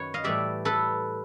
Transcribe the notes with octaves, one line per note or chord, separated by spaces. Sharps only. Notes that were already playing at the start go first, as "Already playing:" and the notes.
Already playing: F#2 D#3 B4 C#5
D#5 F5
A2 E3 G3 D5 E5
A4 B4